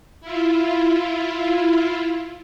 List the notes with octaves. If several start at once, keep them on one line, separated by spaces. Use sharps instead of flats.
E4 F4